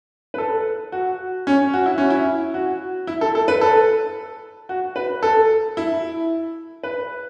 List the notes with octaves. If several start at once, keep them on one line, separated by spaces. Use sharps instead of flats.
B4
A4
F#4
C#4
F#4
E4
C#4
E4
F#4
E4
A4
A4
B4
A4
F#4
B4
A4
E4
B4